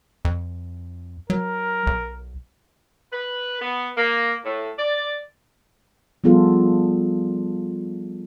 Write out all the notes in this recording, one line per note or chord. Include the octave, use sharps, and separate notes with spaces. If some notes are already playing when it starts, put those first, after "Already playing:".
F2
F#3 A#4
B1
B4
B3
A#3
A2
D5
F3 G3 B3 F4 G#4 A4